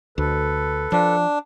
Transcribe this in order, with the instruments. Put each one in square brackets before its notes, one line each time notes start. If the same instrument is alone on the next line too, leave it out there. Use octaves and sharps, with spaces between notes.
[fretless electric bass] D2 [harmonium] A4 B4
[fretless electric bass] F3 [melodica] D4